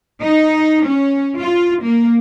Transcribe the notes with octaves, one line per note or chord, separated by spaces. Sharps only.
D#4
C#4
F4
A#3